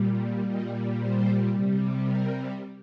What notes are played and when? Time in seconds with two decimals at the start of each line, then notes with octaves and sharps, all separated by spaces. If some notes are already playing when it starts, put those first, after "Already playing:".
Already playing: A#2 G3
0.45 A#2 G3 D#5
0.97 C5
1.49 C3 G3
2.00 A#4